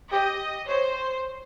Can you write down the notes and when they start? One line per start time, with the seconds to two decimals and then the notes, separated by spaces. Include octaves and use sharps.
0.12 G4 D#5
0.68 C5 C#5